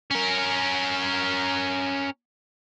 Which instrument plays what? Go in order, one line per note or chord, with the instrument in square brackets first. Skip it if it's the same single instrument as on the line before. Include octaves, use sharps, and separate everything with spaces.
[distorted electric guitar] C#4 A#4